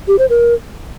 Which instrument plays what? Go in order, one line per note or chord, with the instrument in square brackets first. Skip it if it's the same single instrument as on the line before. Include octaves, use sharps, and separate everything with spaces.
[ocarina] G4
C5
A#4